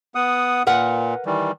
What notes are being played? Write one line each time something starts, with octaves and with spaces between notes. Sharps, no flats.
B3 F#5 D#6
A#2 A#4 B4 F#5
D#3 E3 G3